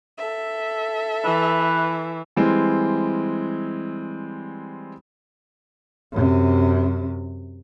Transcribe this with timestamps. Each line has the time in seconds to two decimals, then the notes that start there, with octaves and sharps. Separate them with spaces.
0.18 A4 E5
1.25 E3 B4
2.36 E3 G3 G#3 C4
6.12 F#2 C3